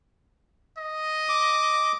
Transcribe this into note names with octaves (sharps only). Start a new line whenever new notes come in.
D#5
D6